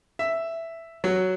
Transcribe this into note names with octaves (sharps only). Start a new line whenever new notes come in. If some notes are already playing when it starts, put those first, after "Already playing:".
E5
F#3